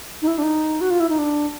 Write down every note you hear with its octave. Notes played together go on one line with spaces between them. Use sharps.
D#4
E4
D4
D#4
F#4
F4
E4
D#4
D4